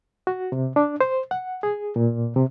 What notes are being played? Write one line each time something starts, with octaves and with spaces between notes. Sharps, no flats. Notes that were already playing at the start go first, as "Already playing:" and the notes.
F#4
C3
D4
C5
F#5
G#4
A#2
C3